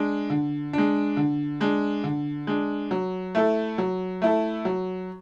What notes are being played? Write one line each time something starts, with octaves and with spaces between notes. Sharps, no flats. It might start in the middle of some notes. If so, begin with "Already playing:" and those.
Already playing: G#3 D4
D3
G#3 D4
D3
G#3 D4
D3
G#3 D4
F#3
A3 E4 A4
F#3
A3 E4 A4
F#3